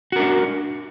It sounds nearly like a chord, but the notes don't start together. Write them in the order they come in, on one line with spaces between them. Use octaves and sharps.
F#4 A#4 D4